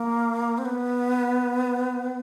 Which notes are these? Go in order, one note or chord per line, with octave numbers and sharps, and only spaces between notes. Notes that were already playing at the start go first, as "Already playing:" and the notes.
Already playing: A#3
C4
B3